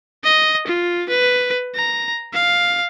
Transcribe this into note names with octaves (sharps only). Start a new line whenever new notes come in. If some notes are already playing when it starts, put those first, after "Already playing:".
D#5
F4
B4
A#5
F5